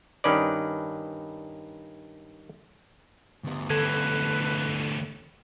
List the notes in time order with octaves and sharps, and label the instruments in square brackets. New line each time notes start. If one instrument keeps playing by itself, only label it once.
[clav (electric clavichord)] G2 D#3 C#4 B4 D5
[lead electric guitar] D2 B3
[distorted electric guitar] D3 E3 [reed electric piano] A4 G#6 [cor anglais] B4